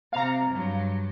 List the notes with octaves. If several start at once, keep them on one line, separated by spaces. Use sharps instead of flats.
C3 F5 A#5
G2 F#3